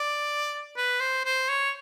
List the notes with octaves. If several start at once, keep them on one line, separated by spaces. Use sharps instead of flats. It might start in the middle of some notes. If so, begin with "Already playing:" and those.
Already playing: D5
B4
C5
C5
C#5